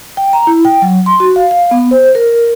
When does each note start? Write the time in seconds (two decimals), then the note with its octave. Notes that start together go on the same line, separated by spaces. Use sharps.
0.17 G5
0.33 A#5
0.47 E4
0.65 G5
0.82 F#3
1.06 C6
1.20 F#4
1.36 F5
1.51 F5
1.71 B3
1.91 C5
2.15 A#4